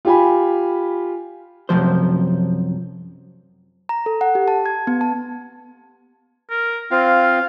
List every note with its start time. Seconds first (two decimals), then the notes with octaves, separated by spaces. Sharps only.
0.05 F4 G4 G#5 B5
1.69 F#2 C3 F3 C5
3.89 A#5
4.06 A4
4.21 F#5
4.35 G4
4.48 A5
4.66 G#6
4.87 B3
5.01 A5
6.50 A#4
6.91 C4 F4 F5